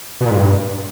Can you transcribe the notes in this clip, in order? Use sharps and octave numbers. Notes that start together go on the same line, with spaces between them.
B2
A#2
G#2
G2